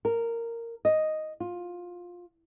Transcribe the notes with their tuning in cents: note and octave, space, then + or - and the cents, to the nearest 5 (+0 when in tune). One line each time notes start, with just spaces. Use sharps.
A#4 -10
D#5 +0
F4 +15